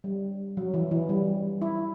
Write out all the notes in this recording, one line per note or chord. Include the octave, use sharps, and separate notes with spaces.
G3
F#3
E3
E3
G3
E4